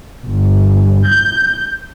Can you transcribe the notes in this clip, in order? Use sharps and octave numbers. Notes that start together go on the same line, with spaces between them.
G1
G6